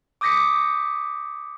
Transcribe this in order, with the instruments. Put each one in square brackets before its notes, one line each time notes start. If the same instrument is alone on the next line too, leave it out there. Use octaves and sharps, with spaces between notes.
[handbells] D6 D#6 G6 A#6 B6 C#7